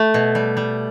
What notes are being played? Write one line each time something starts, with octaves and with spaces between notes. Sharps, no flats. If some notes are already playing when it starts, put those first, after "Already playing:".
Already playing: A3
B2
G3
G3